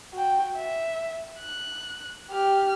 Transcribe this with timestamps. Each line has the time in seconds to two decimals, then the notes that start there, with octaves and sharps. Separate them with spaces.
0.13 F#4 G5
0.56 E5
1.40 F#6
2.30 G4 F6